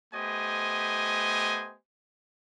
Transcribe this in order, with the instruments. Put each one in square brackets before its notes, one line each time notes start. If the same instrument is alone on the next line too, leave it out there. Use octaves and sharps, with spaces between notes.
[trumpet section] A3 B3 G4 C5 D#5 G#5